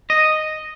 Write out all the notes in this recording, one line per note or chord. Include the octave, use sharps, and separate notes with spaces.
D#5